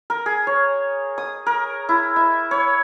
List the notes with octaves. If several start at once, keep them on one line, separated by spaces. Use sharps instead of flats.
A#4
G#4
C#5
D#6
A#4
E4
E5
C#5